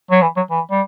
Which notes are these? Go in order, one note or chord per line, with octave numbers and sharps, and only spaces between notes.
F#3
E3
F#3
E3
G3